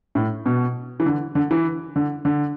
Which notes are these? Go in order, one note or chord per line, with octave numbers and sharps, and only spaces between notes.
A2
B2
E3
D3
D3
E3
D3
D3